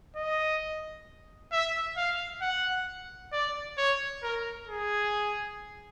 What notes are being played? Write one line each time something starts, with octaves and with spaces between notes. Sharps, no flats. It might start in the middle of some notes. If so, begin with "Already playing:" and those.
D#5
E5
F5
F#5
D5
C#5
A#4
G#4